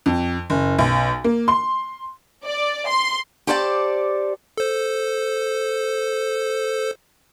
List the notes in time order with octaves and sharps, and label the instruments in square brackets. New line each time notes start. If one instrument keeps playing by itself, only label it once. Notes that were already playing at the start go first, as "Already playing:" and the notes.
[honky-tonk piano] F2
F#1
B1
A#3
C6
[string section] D5
C6
[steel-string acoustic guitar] G4 A4 C5 D5 G5 A5
[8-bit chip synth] A4 C5